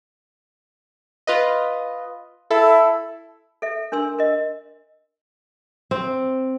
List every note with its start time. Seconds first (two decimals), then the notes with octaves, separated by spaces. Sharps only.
1.27 F4 B4 D#5
2.51 E4 A4
3.62 A4 E5
3.92 D4 A#4 C6 E6
4.19 A#4 D#5
5.91 C4